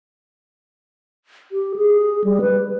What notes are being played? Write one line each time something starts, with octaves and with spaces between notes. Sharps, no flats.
G4
G#4
G3
B4